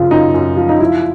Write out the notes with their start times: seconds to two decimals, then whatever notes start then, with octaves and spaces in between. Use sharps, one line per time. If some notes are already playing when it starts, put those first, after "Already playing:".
Already playing: F#2 C#3 F3 F4
0.11 F#2 D#4
0.34 F#2
0.57 F3
0.69 D#4
0.80 F3 E4